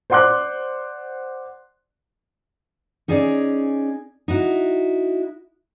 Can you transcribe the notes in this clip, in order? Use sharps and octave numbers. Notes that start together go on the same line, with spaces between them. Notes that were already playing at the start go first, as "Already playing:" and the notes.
C5 D5 F#5 C6 D6 F#6
C#4 D#4 G#4 D5
D#4 E4 F#4